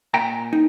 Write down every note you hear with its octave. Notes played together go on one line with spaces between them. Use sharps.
A#2 G5 A#5
D#4